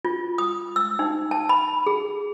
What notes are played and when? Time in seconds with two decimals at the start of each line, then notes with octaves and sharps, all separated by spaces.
0.05 F4
0.38 D#6
0.76 E6
0.99 D#4
1.31 A5
1.49 B5
1.87 G#4